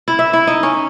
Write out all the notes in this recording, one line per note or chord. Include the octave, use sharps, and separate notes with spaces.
E4
E5
E4
D#4
C#4